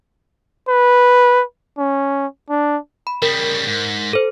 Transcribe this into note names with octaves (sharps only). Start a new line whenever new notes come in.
B4
C#4
D4
B5
C#3 G3 A#4
G#2
A4 C5